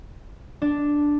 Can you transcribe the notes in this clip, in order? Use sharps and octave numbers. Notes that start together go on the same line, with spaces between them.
D4